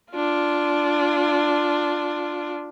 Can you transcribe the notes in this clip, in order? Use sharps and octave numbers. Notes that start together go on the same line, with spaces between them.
D4 F4